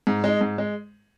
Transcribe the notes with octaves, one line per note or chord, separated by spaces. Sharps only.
G#2
G#3 D#4
G#2
G#3